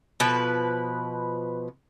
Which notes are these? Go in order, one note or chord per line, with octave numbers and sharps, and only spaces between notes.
B2 F3 B4